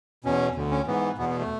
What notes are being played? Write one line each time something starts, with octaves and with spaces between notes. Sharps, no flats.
E2 B2 C#4
D2 D3
C#4
G#2 E3 B3
E2 B2 B3
B3
A3